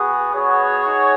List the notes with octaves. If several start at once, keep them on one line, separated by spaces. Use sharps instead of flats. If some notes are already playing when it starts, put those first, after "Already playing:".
Already playing: B3 F#4 G#4
B3 F#4 G#4 C#5
D#4 F#4